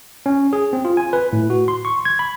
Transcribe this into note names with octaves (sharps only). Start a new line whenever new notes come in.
C#4
G#4
C4
F4
G#5
B4
A2
F#4
C6
C#6
G#6
B5